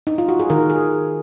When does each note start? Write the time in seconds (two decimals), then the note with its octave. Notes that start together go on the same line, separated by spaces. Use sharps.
0.07 D#4
0.18 F4
0.29 F#4
0.39 G#4
0.50 D#3 A#4
0.70 G#4